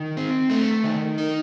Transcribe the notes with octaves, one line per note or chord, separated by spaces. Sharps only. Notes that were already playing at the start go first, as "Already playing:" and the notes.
Already playing: D#3
C4
A3
D#3
D#4